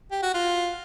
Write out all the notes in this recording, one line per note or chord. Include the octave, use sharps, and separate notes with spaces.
G4
F#4
F4